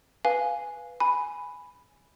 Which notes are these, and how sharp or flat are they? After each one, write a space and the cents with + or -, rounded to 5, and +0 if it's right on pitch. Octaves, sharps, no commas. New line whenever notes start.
B4 +0 F5 +0 G#5 +0
G#5 +0 B5 +0